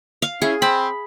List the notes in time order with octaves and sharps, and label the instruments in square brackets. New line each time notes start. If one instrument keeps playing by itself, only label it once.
[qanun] F5
[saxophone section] C#4 E4 [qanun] G#4
[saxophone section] C4 [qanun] B5